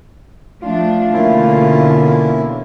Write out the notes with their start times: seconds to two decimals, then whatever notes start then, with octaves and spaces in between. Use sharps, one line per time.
0.62 F3 A3 D4 F4
1.13 B2 D3 E3 A#3 C#4 E4